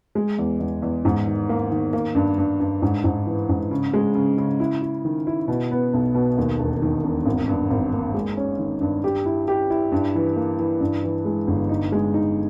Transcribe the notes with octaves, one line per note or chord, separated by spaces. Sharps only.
G#3
E2
E2
E2
G#2
D#3
A#3
D#3
A#3
G2
G2
G2
G#2
G#2
E3
G#2
C#3
G#3
C#3
C#3
E4
E4
D#3
E4
B2
B3
B1
B2
D#2
E1
D#3
E1
G#1
G2
G#1
A#3
G#3
C#4
D#3
G2
G4
E4
G4
E4
G2
E3
A#3
E3
G2
E3
G#3
G1
D#4
G#3
D#4